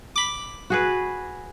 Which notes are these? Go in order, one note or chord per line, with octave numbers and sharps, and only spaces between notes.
B5 D6
F#4 G#4 B4